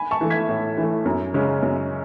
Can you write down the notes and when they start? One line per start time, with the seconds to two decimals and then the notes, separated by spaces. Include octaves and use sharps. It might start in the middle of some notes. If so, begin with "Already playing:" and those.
Already playing: G#5 B5
0.11 A5 C#6
0.21 E3 A3
0.30 G#6 B6
0.49 A2
0.78 E3 A3
1.06 F#2
1.34 C#3 G#3 C#4
1.62 F#2